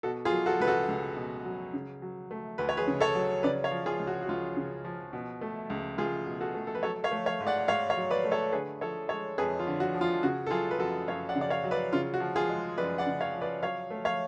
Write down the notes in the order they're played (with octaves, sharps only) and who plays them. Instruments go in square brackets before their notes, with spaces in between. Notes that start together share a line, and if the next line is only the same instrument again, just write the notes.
[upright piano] B2 F#4 A4
F4 G#4
F#3
F#4 A4
C#2 B4
F#4 A4
C#2
B2
F#3
C#3
F#3
A3
D2 B4
C#5
G#4 B4
C#3
A4 C#5
F#3
C#3 B4 D5
C#5 F5
F3
F4 G#4
C#2
F#4
F#4
C#2 F4
C#3
F3
B2
A3
C#2
C#2 F4 G#4
B2
F#4 A4
A3
A4
B4
F#3 A4 C#5
C#5 F5
A3
C#5 F5
G#2
D5 F#5
G#2 C#5 F5
C#5 F5
F#3
B4 D5
A3
A4 C#5
D3 G#4 B4
F3 A4 C#5
G#3 A4 C#5
F2 G#4 B4
F4
D3
F#4
F3
F4
C#3 F#4
A4
F#3 F4 G#4
B4
F#2 F#4 A4
F#2 C#5 F5
D5 F#5
C#3
D5
C#5 F5
F#3
B4 D5
C#3 F4
F#4
F3
F4 G#4
G#3
F#2 B4 D5
D5 F#5
C#3
C#5 F5
F3
B4 D5
F#3 C#5 F5
A3
C#5 F5